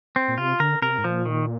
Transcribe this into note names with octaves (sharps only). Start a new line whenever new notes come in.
C4
A#2
C3 F4
D3 A#4
C3 A#4
G#2
A#2 F3
D#3